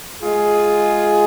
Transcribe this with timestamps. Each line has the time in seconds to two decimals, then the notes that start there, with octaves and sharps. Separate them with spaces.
0.22 G#3 F4 G#4